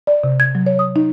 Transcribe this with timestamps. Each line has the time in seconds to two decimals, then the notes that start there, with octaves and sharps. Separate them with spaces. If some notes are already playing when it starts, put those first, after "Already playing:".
0.07 D5
0.24 C3
0.40 G#6
0.55 F#3
0.66 C#5
0.79 D#6
0.96 D#4